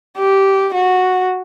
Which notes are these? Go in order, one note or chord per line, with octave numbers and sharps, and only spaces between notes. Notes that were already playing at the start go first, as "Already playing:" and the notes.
G4
F#4